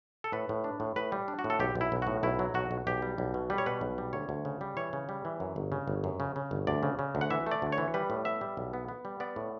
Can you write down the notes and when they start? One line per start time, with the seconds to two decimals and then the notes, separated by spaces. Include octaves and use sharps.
0.24 A4
0.32 A2 B4
0.49 A2
0.64 D4
0.80 A2
0.96 A2 B4
1.12 G3
1.28 D4
1.39 F#4
1.44 A2
1.50 A4
1.60 B1 G4
1.75 B1
1.81 E4
1.92 B1
2.02 A2 F#4
2.23 B1 E4
2.39 F#3
2.54 B1 F#4
2.71 B1
2.87 B1 G4
3.02 G3
3.18 B1
3.34 B2
3.50 G3 B4
3.58 C#5
3.66 B2 B4
3.81 B1
3.98 G3
4.13 D2 C#5
4.29 D2
4.45 C#3
4.61 G3
4.77 E3 C#5
4.93 C#3
5.09 G3
5.25 E3
5.40 F#2
5.56 G1
5.72 C#3
5.88 G1
6.04 F#2
6.20 C#3
6.36 C#3
6.51 G1
6.67 D2 D5
6.83 C#3
6.99 C#3
7.15 D2
7.21 F#5
7.30 E3 E5
7.46 A3
7.51 D5
7.62 D2
7.72 C#5
7.78 E3
7.94 G3 B4
8.10 A2
8.25 B3 E5
8.41 G3
8.57 B1
8.73 B3
8.88 B3
9.05 G3
9.20 B3 D5
9.36 A2